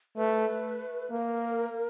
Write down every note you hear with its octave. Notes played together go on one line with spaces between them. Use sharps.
A3 B4
A#3 A#4 B4